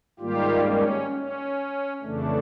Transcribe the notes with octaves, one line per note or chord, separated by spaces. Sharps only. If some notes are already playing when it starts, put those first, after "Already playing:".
G#2 D#3 G3 A#3 F4 G4
C#4
C#4
F2 C#3 E3 A3 D4